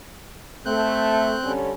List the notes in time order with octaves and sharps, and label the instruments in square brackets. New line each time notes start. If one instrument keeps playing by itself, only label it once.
[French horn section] A3 [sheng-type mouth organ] C4 F#6 G6
[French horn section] D3 G3 C#4